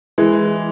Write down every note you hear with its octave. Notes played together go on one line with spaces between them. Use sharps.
E3 G#3